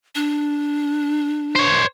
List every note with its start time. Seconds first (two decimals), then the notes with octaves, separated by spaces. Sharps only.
0.15 D4
1.56 C5 C#5